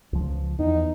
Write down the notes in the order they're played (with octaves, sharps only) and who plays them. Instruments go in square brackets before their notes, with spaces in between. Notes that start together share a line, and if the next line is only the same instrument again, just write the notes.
[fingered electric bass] C#2 F3
[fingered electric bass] E2 [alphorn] D#4